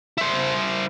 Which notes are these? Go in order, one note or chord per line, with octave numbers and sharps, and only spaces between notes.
E4 C5